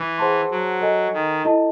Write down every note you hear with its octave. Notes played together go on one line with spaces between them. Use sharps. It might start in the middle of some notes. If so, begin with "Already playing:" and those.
Already playing: E3
G#4 C5 F#5 A5 C6
F#3
A4 D#5 G#5
D#3
E4 A4 D#5 A5